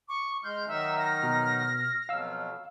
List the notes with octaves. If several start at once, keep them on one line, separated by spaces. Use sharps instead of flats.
C#6 D6
G#3 C6 F6 G6
D#3 F#3 D#4 E5
A#6
B2
F2 B2 F#3 F5 E6